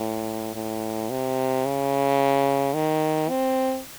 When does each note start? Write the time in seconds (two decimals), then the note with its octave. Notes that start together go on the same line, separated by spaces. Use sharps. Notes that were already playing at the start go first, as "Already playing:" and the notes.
Already playing: A2
0.55 A2
1.10 C3
1.66 C#3
2.74 D#3
3.30 C4